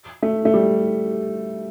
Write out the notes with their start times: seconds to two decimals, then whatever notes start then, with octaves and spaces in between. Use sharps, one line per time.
0.22 A3
0.45 A3
0.54 G3